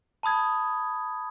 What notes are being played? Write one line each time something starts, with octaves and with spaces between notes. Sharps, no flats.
A5 B5 D#6 G#6